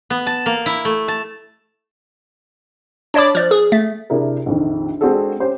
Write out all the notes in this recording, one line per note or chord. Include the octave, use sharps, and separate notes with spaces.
B3
A5
A#3
E4
A3
A5
D4 C#5 D5 B5 D6
F3 D5 F#6
G#4
A3
C3 D4 E4 G4 G#4 A#4
A#1 F2 D#3
G#3 C4 D4 F#4 G#4 A4
C#4 G4 C5